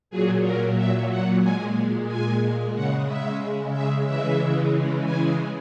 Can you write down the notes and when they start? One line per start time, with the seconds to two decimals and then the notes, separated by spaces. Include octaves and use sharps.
0.10 A#2 F#3 G#4
0.43 A#4
0.76 E5
1.09 F#5
1.42 A#2 G#3 G#5
2.08 G#5
2.74 C#3 G#3 F#5
3.07 E5
3.73 E5
4.06 C#3 E3 G#3 E5
5.05 G#5